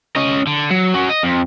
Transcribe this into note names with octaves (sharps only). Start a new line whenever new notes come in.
C#4 D#5
D3
F#3
C#4 F#4
D#5
F2